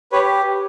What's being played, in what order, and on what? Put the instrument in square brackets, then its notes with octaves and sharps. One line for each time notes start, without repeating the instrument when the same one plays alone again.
[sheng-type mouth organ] G4 B4 C#5